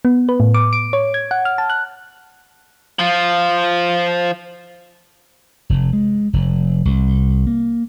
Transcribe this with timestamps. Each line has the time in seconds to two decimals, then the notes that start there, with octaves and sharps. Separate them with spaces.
0.05 B3
0.29 B4
0.40 A2
0.54 D6
0.73 D7
0.93 C#5
1.14 G#6
1.31 F#5
1.45 F6
1.58 A5
1.70 F#6
2.99 F3 F4
5.70 F1
5.93 G#3
6.33 F1
6.85 C2
7.47 A#3